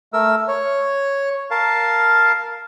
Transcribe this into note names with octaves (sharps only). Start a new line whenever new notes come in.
A3 A#4 E6
C#5
A#4 F5 A5